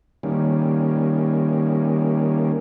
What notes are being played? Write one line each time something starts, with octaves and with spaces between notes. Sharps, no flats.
D#3 G3 A#3 C#4